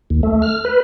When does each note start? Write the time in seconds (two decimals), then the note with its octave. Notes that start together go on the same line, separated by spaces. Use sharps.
0.10 D#2
0.23 A3
0.42 F6
0.65 B4